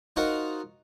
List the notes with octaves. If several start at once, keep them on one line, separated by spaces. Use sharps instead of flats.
D#4 F4 F#4 A#4 C5 F#5